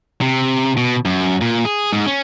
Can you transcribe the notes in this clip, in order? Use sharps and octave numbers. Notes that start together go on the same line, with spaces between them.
C3
B2
F#2
A#2
G#4
G#2
C#4